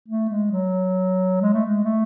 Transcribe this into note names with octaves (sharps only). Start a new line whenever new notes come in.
A3
G#3
F#3
G#3
A3
G#3
A3